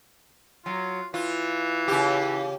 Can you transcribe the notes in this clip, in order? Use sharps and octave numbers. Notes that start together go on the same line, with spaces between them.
F#3 F4
E3 F4
C#3 G4